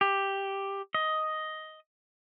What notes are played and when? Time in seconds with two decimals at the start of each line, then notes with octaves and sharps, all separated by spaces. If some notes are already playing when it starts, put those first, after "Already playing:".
0.01 G4
0.94 D#5